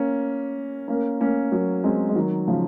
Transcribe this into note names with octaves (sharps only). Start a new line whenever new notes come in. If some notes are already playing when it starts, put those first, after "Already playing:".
Already playing: A#3 C#4
A#3 C#4
A#3 C#4
F#3 A#3
G#3 C4
G#3
D#3 F#3
C#3 F3